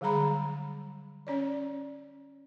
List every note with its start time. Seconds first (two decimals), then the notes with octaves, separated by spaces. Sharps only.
0.01 D3 F#3 G3 G#4 A#5 B5
1.27 C#4 C#5 D5